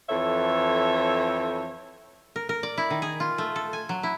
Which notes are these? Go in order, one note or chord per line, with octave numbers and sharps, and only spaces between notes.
F2 E3 A4 C#5 E5
A#4
A#4
D5
E4
D#3
G#4
F4
A3
A4
G#5
F#3
E4